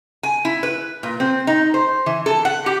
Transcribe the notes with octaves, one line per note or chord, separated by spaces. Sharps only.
G#5
E4
B4
A#2
C4
D#4
C5
E3
A4
F#5
G4